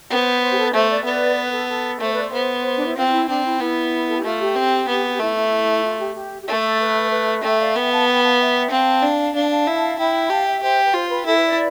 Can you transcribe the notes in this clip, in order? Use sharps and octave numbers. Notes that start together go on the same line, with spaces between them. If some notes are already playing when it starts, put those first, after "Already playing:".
B3 C5
C5
G4
A4
B4
A3 C5
B4 D5
B3 B4 D5
B4
A4
A4
A3 C5
B4 D5
C5
B3
D4
E4
C4 F4
F4
E4
C4 D4
E4
B3 E4
A4
G4
A3 F4
G4
C4
B3
A3 E4
E4
F4
G4
G4
G4
A3 A4
B4
B4
A3 E5 G5
D5 F5
B3 E5 G5
F5 A5
G5 B5
F5 A5
E5 G5
C4 F5 A5
D4
D4 F5 A5
F5 A5
E4
E4 G5 B5
G4 F5 A5
E5 G5
G4 C5 E5
B4
F4 C5
B4
E4 A4
B4
B4 D5